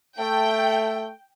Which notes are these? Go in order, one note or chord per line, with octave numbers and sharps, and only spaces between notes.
A3 G5